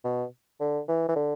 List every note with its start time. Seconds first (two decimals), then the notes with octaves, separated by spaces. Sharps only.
0.04 B2
0.60 D3
0.88 E3
1.08 E3
1.16 D3